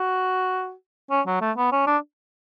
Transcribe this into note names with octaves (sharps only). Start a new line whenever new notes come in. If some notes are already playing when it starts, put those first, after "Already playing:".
Already playing: F#4
C#4
F#3
A3
B3
C#4
D4